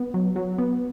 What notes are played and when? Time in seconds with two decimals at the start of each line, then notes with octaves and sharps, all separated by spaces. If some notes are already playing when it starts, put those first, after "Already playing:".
Already playing: B3
0.14 F#3
0.36 F#3
0.58 B3